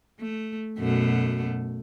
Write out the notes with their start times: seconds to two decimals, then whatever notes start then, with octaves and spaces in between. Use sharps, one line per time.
0.20 A3
0.79 F#2 B2 A3